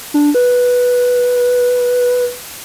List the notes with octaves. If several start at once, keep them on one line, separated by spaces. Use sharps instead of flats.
D4
B4